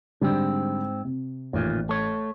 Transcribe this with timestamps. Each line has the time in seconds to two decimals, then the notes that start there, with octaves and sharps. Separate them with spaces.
0.21 G#2 D3 G3 C4
1.05 C3
1.53 A1 D#2 A#2
1.89 A3 C#5